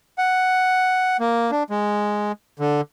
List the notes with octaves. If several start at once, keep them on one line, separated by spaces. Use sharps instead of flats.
F#5
A#3
D4
G#3
D3